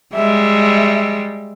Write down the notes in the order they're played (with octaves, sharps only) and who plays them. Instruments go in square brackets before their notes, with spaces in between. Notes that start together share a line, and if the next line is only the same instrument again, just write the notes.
[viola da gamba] G3 G#3 [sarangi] E5